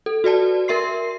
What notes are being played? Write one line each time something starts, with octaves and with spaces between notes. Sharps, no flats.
A4
F#4 B4 D5 A5
A#4 E5 C6 C7